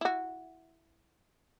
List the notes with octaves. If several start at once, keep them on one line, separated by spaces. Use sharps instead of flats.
E4 F#4